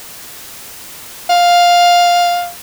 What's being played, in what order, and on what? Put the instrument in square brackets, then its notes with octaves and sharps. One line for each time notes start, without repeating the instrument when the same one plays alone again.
[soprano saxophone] F5